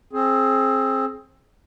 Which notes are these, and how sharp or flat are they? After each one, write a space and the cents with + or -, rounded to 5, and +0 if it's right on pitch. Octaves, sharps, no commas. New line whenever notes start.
C4 +20 G#4 +25